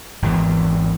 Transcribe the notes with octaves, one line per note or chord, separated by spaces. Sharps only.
G#1 E2 D#3 E3